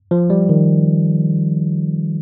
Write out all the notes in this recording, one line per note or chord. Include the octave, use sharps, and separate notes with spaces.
F3
G3
D#3